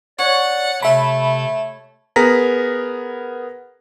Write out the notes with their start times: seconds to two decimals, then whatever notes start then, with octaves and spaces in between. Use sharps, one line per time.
0.19 C#5 D5 F#5
0.83 C3 A3 E5 B5
2.16 B3 G#4 A#4 A#5 A#6 B6